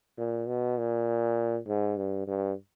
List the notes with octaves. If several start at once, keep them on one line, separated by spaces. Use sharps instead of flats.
A#2
B2
A#2
G#2
G2
G2